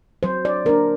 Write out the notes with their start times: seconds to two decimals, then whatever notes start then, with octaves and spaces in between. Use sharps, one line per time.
0.23 F#3 C5
0.45 D5
0.65 A#3 D4 A#4